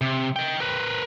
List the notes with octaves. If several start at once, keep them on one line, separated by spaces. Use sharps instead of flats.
C3
D#5 G5
A#4 B4